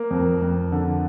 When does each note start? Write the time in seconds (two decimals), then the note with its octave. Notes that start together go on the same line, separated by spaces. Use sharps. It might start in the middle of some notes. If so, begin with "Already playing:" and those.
Already playing: A#3
0.11 F2
0.42 F2
0.72 D3